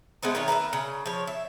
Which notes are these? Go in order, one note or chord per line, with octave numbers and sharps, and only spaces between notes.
G#3 A3 B3 C4
D#3 A3 C#5
A#4 B4 D5 E5
C#3
F3 C#5
E5